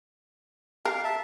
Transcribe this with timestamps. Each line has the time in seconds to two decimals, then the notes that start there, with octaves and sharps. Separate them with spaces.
0.85 A#4 F5
1.04 E5 A5